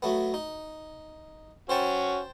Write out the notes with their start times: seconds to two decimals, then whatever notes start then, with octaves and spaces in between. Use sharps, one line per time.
0.02 F#3 A3 B3
0.34 D#4
1.69 C#4 F#4 C5 G5 A5